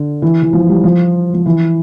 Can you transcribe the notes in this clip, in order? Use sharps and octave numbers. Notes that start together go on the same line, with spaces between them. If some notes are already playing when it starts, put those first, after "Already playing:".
Already playing: D3
E3
E3
F3
G3
F3
F3
E3